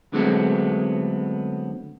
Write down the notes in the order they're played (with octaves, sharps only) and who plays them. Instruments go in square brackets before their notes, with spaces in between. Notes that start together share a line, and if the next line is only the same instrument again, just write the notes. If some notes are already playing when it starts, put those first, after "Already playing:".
[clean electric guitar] D3 F#3 G#3 A3 B3 C4